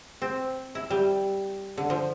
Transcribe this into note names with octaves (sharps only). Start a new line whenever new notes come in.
C4
E4
G3
D3
F3